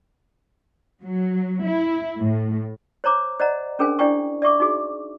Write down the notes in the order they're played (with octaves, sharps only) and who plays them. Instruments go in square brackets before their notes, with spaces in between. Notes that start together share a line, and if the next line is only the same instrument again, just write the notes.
[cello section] F#3
E4
A2
[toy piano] C5 C#5 A#5 D6
C5 D5 D#5 F#5 A#5
C#4 D4 G#4 A#4 C5 G#5
D4 E4 D5 G5 G#5 C#6
D5 E5 C#6 D6
D#4 F#4 G#4